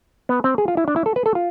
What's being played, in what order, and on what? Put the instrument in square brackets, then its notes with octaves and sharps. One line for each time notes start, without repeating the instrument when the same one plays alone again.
[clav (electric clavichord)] B3
C4
G#4
F4
E4
D4
E4
A4
B4
A4
F4